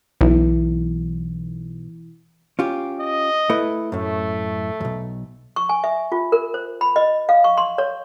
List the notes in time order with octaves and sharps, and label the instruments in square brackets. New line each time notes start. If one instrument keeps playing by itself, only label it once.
[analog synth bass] B1 [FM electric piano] E3
[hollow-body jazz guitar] C#4 F4 G4
[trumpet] D#5
[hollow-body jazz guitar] A3 E4 B4
[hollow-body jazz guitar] F#2 A2 [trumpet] A3
[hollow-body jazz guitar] B1 E2
[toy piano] C#6
G#5
E5
F4
A#4
C5
B5
D#5
F5
C#6
C6
C#5